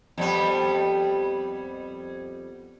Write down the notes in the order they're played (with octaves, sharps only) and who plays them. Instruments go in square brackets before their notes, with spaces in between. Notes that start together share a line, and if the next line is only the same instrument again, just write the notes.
[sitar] F2 G3 B3